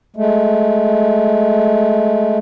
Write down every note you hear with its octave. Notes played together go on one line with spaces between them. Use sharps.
G#3 A3